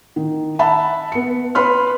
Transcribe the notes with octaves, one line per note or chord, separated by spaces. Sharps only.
D#3
E5 F#5 A5 B5
B3 C#7
B4 B5 C6 F6